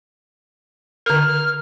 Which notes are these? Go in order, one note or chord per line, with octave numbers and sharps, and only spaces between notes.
D3 A#4 F6